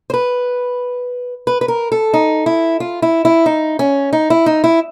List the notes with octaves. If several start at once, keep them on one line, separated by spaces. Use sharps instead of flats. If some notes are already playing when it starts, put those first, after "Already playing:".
C5
B4
B4
B4
A#4
A4
D#4
E4
F4
E4
E4
D#4
C#4
D#4
E4
D#4
E4